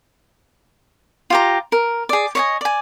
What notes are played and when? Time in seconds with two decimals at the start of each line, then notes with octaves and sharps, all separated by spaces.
1.30 F4 G4 A#5
1.72 A#4
2.09 G#4 D5
2.35 C#5 D#5 G#5
2.61 D5 G#5